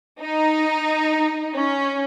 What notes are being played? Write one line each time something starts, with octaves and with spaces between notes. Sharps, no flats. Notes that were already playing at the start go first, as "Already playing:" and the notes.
D#4
C#4